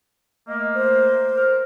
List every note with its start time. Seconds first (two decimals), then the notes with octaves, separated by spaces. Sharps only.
0.48 A3 A#3 D#5
0.74 C5
1.36 A#4 F6